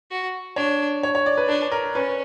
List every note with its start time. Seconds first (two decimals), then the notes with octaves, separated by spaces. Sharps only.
0.11 F#4
0.56 D4 C#5
1.03 C#5
1.15 C#5
1.26 D5
1.37 B4
1.49 D4 B4
1.72 A#4
1.94 C#4 B4